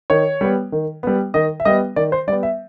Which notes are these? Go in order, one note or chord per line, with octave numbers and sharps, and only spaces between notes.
D#3 C#5
G3 B3
D#3
G3 B3
D#3 D#5
E5
G3 B3 D#5
D#3 D5
C5
G3 B3 D5
E5